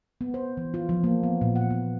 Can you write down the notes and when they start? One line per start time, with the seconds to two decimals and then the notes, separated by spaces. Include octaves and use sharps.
0.21 B3
0.34 C5
0.57 E3
0.74 F4
0.89 F3
1.04 A#3
1.23 B3
1.41 A#2
1.56 F#5
1.70 B3